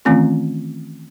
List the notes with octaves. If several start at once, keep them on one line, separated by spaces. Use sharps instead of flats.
D#3 E3 A3 C4 C#4 F4